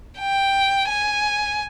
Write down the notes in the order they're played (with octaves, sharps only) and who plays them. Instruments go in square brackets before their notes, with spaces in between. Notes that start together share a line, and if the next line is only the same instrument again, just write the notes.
[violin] G5
G#5